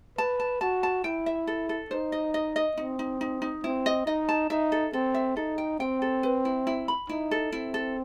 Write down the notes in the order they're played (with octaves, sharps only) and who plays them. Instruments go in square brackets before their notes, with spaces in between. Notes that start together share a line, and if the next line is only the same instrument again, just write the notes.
[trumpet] B4 [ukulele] A5
[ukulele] A5
[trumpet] F#4 [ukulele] A5
[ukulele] A5
[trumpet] E4 [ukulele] G5
[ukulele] E5
A4
A4
[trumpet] D#4 [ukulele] C5
[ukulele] D#5
D#5
D#5
[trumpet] C4 [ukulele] D#4
[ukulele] D#4
D#4
D#4
[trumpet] C4 [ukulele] E4
[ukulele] D#5
[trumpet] D#4 [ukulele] D#5
[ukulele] A5
[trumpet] D#4 [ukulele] E5
[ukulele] A4
[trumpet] C4 [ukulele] A4
[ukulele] E5
[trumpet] D#4 [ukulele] A4
[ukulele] G5
[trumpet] C4 [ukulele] G5
[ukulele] A4
B4
E4
E4
B5
[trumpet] D#4 [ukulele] E4
[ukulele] A4
[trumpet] C4 [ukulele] E4
[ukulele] A4